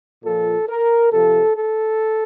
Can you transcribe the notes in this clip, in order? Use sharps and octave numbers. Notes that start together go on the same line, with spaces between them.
A#2 F3 A4
A#4
C3 F3 A4
A4